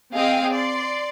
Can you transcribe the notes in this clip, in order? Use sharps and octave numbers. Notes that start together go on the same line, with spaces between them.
C4 G#4 D#5 F5 G5
D5 C6